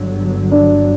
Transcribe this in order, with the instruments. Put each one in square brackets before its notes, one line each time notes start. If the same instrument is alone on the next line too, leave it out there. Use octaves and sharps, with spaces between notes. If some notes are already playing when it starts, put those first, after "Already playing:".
Already playing: [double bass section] G1 G2 D3 F#3
[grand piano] D4